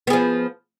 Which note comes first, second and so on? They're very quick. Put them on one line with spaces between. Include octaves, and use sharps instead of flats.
B3 G#4 F3